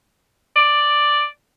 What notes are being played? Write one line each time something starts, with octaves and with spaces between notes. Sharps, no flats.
D5